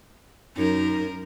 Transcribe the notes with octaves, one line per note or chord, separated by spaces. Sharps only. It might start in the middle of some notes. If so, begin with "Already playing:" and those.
F#2 D#4 A#4